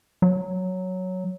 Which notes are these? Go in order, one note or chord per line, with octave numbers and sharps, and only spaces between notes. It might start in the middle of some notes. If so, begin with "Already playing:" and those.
F#3